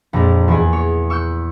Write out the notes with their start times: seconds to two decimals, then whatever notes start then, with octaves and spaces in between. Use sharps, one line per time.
0.13 A#1 F2 A#5
0.48 E2 E4 G#4
0.73 C#5
1.10 C#6 E6 F#6 G6